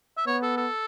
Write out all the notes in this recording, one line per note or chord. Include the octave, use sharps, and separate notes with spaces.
E5
B3 C#5
A4
A4